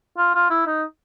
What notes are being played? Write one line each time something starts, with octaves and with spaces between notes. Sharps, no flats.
F4
F4
E4
D#4